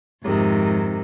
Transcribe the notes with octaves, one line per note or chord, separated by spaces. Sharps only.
F2 G#2 C3 D#3